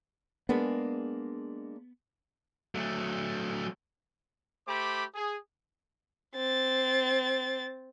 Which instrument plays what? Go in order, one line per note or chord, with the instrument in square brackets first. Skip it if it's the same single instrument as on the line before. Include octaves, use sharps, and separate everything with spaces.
[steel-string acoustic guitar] G#3 A#3 D4 [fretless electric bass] B3
[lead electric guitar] F#3 A3
[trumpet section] A3 G4 C5 B5 D6
G#4
[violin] C4 A6